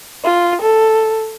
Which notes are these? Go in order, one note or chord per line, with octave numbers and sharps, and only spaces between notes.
F4
A4